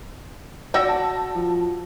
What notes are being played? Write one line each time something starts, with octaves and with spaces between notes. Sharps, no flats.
F#4 D5 G5 E6 A#6
A5
F3